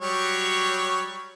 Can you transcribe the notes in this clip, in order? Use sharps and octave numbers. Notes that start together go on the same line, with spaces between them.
F#3 G3 C#5